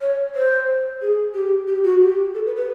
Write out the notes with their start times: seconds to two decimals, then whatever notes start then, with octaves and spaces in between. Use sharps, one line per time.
0.01 C#5
0.35 C5
1.02 G#4
1.34 G4
1.67 G4
1.84 F#4
2.01 G4
2.34 A4
2.46 B4
2.56 B4